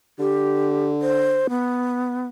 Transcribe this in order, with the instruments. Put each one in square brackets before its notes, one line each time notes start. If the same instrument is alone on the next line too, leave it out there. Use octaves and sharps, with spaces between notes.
[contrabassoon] D3 [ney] G4
[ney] C5
B3